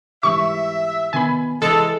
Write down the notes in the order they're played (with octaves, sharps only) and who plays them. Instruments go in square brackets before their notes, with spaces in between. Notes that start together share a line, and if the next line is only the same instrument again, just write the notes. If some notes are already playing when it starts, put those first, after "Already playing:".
[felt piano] G#2 E3 G3 [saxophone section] E5 [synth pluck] C#6
[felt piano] B2 D#3 B3 [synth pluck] G#5 B5
[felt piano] E3 [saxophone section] G#3 [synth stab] A4